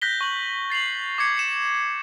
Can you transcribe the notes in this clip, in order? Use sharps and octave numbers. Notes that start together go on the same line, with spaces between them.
F#6 G6 A#6 B6 G7
C#6 F#7
A6 C7 F7 F#7
D6 G#6 C#7
C#7 E7